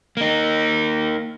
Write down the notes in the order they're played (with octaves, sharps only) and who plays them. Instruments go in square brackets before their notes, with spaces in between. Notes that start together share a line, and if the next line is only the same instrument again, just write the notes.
[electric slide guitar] A#3 D#4